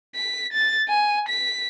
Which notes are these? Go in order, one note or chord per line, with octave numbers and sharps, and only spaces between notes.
B6
A6
G#5
B6